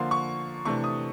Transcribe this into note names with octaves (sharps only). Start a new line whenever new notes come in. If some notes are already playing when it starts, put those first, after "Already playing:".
Already playing: D3 F3 A#3 C6
C#6
C3 E3 A3 D4 C#6
D#6